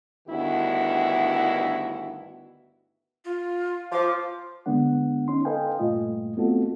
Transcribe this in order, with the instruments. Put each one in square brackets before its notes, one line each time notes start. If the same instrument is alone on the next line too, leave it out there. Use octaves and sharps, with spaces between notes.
[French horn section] D2 G2 D#3 B3 E4 F#4
[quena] F4
[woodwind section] F3 [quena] D6
[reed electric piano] D3 G#3 B3 D4 F#5
C#4 D#4 C6
A4 B4 D#5 F5 G5 G#5
G2 A#2 A3 F4 D#5
A3 B3 C4 F4 F#4 A4